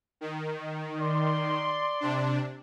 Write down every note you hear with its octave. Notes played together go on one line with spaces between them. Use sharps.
D#3
D5 C6
C3 D4